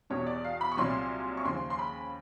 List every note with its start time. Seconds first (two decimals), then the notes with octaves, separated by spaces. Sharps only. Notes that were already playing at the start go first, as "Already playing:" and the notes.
0.10 E2 B2 G3 C#5
0.27 D5
0.44 F5
0.61 B5
0.72 C#6
0.77 C2 A#2 F#3 C6
1.37 C#6
1.45 D#2 C#3 F3 C6
1.70 C6
1.79 B5